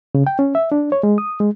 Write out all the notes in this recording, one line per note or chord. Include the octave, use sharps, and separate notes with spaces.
C#3
G5
C#4
E5
D4
C#5
G#3
D#6
G#3